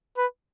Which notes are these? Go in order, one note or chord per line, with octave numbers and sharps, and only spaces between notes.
B4